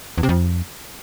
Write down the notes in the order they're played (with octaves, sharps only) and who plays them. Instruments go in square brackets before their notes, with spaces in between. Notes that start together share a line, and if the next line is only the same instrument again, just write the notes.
[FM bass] E2
C3
F2